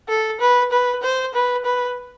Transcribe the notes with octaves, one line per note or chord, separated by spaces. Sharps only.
A4
B4
B4
C5
B4
B4